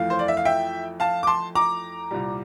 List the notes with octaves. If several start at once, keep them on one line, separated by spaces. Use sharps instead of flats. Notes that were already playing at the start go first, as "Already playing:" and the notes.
Already playing: F2 E3 A3 F5
C5
D5
E5
F5
E5 G5
F5 A5
D6
A5 C6
A#5 D6
C2 A#2 G3